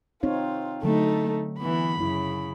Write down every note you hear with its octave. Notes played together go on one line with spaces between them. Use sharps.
C4 D#4 F4 C#5
D3 F#3 A3 D#4 A4
E3 B3 B5
F#2 C#3 E4